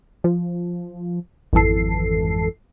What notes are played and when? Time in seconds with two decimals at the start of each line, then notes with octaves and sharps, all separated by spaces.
0.24 F3
1.53 G#1 F2 E3 A4 C7